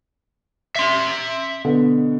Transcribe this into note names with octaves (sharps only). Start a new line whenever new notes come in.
E5 C6
B2 D3 B3